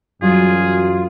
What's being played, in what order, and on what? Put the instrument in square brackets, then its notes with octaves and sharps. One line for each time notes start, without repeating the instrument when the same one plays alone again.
[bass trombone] F#2 [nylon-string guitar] E3 F#3 G3 [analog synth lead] F4 [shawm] G#4